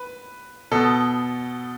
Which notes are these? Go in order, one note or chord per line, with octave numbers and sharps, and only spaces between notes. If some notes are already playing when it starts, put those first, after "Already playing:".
Already playing: B4
B2 B3 A4